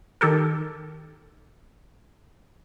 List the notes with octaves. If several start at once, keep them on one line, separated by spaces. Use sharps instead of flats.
D#3 G4 A4 A#4